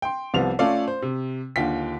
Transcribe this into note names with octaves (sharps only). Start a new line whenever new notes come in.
G5 C6
C2 C3 F3 B3 F5 F7
A3 C#4 F4 A4 D5 F5
C5
C3
D#2 D3 F4 G5 B6